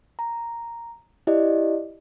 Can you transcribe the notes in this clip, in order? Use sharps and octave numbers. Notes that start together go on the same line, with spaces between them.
A#5
E4 G4 D5 D#5